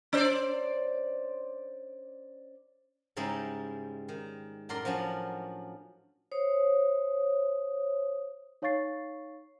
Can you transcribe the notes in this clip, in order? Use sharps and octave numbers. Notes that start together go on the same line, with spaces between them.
C#4 C5 D5
G#2 C#3 G3 G#3 D#4 E4
D#3
F#2 A2 A#4 D5 C6
F3 F#3 C#4 D4
C5 C#5 D#6
D#4 C#5 F5 C#6 A6 C7